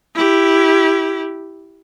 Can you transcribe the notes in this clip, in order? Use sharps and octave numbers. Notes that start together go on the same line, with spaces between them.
E4 G4